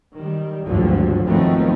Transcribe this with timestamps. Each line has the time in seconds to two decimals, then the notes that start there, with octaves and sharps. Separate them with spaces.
0.18 D#3 G3
0.66 G#1 D2 G2 D3 F3 F#3
1.26 D#3 F3 F#3 A3 B3 C4